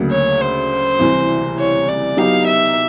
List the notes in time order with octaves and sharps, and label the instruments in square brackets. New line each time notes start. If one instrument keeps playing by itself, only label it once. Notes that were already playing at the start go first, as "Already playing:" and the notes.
Already playing: [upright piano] D2 C#3 F#3 A#3
[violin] C#5
C5
[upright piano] C2 C3 E3
[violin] C#5
D5
[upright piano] F#3 B3 D#4 G4 [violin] F5
[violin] E5